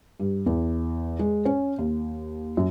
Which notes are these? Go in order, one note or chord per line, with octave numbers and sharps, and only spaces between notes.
G2
E2
G#3
C#4
D#2
F#2